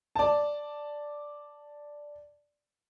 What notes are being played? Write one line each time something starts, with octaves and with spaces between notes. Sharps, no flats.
D5 A5